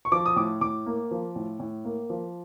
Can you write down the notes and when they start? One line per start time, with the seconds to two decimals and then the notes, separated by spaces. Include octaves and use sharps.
0.05 C#6
0.12 F3 D6
0.26 D#6
0.36 A2 D6
0.61 A2 D6
0.86 A#3
1.11 F3
1.36 A2
1.60 A2
1.85 A#3
2.10 F3